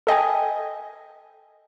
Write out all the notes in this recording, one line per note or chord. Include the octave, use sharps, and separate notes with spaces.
A4 D#5 G5 G#5